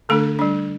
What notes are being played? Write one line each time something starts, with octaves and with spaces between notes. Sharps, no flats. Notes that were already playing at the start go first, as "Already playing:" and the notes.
D3 A3 D4 A4
G3 D4